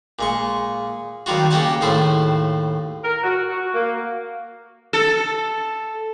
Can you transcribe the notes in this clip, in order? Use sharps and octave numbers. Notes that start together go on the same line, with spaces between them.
A#2 G#3 C#6
D#3 F#3 G3 F4 F#4
C#3 A#3 G4 F#5 G#5 A5
D#2 A2 G#4 C5 A5 B5
A#4
F#4
F#4
A#3
A4